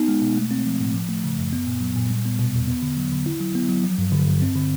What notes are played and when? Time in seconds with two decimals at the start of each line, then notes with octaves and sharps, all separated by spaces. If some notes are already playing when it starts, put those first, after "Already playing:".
Already playing: B3 D#4
0.08 G#3
0.21 B2
0.36 A3
0.51 C4
0.66 F3
0.81 A2
0.94 F3
1.09 A3
1.24 C#3
1.38 F#2
1.53 B3
1.67 A#2
1.81 F#3
1.96 A#2
2.10 G3
2.25 B3
2.39 B2
2.54 E2
2.68 B3
2.82 D3
2.97 F#3
3.12 D3
3.26 E4
3.41 F#3
3.55 B3
3.69 F#3
3.83 F3
3.98 G2
4.12 D3
4.27 G2
4.42 C4
4.55 D3